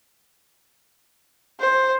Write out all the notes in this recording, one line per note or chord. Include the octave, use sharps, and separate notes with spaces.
C5